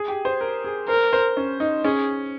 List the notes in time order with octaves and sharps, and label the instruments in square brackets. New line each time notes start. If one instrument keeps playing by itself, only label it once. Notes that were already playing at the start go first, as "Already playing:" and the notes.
Already playing: [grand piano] G#4
G4
C5
A#4
G#4
[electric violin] A#4 [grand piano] C5
[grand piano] C5
C#4
D#4
[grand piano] C#4 [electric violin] G#4